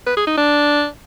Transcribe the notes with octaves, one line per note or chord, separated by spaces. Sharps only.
B4
G#4
D#4
D4